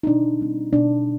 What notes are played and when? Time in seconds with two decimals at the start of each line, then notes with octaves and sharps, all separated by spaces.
0.03 D#4
0.07 B2 D4
0.40 G3 C4
0.73 B2 D4